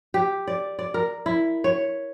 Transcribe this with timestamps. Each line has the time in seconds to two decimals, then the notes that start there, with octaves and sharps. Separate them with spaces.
0.14 G4
0.48 D5
0.79 D5
0.94 A#4
1.26 E4
1.64 C#5